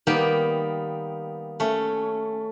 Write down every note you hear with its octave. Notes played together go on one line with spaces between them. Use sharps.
D#3 G3 A#3 B3 G4
A3 C#4